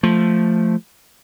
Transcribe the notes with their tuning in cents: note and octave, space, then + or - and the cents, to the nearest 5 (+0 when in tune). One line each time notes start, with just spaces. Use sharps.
F3 +0 A3 +0